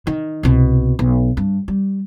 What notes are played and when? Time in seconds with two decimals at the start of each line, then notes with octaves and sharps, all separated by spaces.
0.07 D#3
0.43 C2 B2
0.99 B1
1.37 G2
1.68 G3